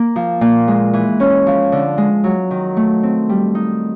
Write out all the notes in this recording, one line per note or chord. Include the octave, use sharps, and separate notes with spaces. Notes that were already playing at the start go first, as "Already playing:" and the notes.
Already playing: A#3
F3
A#2
G#3
E3
C#4
F3
D3
G#3
F#3
D#3
A3
C4
G3
D#4